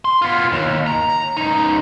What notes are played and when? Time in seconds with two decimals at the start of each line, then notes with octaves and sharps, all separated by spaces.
0.05 C6
0.22 B3 F4
0.52 D#2
0.87 A#5
1.37 C#2 D#4